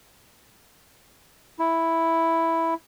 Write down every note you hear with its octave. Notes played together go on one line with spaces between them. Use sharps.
E4